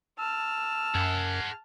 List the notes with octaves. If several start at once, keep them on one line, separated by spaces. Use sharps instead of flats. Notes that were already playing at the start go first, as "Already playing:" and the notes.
A5 E6 F6
F#2 G#4 F#5